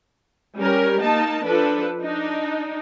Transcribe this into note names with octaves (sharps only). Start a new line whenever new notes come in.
G3 C#4 G4 A#4
A#3 D#4 A5
F3 D4 A4 B4
D4 D#4